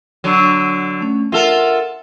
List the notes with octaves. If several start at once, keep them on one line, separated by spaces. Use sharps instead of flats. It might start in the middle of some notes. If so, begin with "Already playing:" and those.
D3 F#3
A3 C#4
F4 A4 A#4 E5 F#5